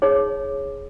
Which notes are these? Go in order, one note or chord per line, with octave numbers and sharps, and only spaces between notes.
D#4 G#4 C#5